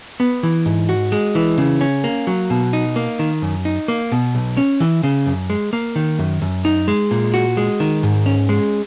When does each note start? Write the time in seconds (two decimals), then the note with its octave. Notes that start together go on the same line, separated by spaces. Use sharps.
0.20 B3
0.43 E3
0.66 G#2
0.89 F#4
1.12 G#3
1.35 E3
1.58 C#3
1.81 C#4
2.04 A#3
2.27 F#3
2.50 B2
2.73 D#4
2.96 A#3
3.19 D#3
3.42 F#2
3.65 D#4
3.88 A#3
4.12 B2
4.35 B1
4.57 C#4
4.80 E3
5.03 C#3
5.26 F#2
5.50 G#3
5.73 A#3
5.96 D#3
6.19 F#2
6.42 F#2
6.65 D#4
6.88 G#3
7.11 A#2
7.34 F#4
7.57 G#3
7.80 D#3
8.03 G#2
8.26 C#4
8.49 G#3